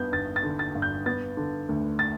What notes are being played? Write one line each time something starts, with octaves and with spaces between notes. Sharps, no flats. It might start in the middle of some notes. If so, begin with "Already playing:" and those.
Already playing: G2 B3 G6
G1 A6
A6
D3
A6
G2
G6
B3 A6
D3
D2
A6